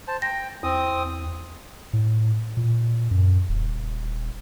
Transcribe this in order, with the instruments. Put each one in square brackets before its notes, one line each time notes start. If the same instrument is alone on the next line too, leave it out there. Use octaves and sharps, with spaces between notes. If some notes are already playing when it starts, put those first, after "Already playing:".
[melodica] C5 A5
[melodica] G5 [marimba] A#6
[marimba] E2 [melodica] C4 D#6
[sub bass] A2
A#2
F#2
D#1